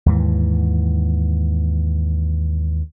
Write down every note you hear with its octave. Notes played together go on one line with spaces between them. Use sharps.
D#2 G#2 E3